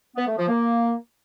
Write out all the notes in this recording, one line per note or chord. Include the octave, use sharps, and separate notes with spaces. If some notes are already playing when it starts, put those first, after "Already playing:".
B3
A3
F3
A#3